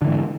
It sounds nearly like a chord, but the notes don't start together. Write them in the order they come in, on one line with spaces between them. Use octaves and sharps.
D3 E3 G#2